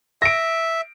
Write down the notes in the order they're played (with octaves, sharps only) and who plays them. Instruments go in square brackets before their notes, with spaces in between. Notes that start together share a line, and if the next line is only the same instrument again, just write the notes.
[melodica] E5 [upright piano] A#6 D7